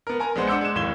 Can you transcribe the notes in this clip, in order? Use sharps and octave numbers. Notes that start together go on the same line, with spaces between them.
B3 A#4
A#4 G#5 A#5
A#1 G#3 B3 C5 F#5
D4 F#5 D6 E6 G6 C#7
G#3 E7
F1 D#2 A2 G#6 E7 G7